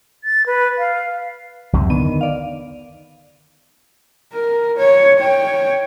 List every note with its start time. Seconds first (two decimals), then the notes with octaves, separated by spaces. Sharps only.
0.24 A6
0.46 B4
0.78 F5
1.73 C#2 F#2 C3
1.90 D3 D#3 B3 D#7
2.21 D5 F5
4.34 A#4
4.78 C#5
5.20 C#5 G5